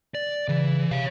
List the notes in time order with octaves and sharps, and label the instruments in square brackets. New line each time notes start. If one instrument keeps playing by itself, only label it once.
[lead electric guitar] D5
[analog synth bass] C#3 [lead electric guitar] E3
[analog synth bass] C3 [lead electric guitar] C#5 F5